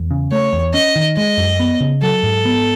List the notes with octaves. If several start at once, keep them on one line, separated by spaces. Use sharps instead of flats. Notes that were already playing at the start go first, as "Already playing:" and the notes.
Already playing: E2
C#3
A3 C#5
E2
C#4 D#5
D#3
G#3 D#5
F#2
B3
C#3
F#3 A4
G#2
B3